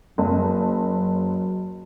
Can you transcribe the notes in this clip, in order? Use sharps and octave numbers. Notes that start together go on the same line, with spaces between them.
F#1 F#3